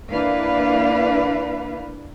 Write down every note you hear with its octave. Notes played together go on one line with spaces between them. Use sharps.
A#3 D4 E4 B4 F5